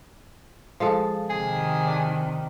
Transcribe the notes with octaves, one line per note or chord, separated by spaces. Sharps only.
F3 G#3 A4
C3 D#3 G#4
D4